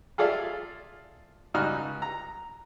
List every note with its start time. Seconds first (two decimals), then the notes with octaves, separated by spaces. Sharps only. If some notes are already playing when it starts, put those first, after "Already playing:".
0.18 F4 G#4 A4 D5 E5 F5
1.54 C#2 G3 D#4 F#4 F6
2.02 A#5